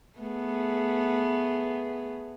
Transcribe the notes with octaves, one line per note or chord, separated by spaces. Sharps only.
A3 B3 G#4